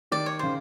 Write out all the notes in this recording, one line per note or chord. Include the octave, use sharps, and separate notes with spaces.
D#3 D5
C#5
C#3 C5